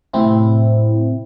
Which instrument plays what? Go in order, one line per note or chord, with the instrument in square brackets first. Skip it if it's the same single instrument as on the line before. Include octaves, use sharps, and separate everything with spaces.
[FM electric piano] A2 C3 C4 E4